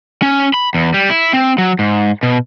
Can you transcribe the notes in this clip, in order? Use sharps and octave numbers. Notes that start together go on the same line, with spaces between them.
C#4
B5
E2
G3
E4
C4
F#3
G#2
B2